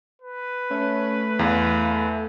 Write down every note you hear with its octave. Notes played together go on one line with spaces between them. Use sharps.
B4
A3 C#4
E2 F5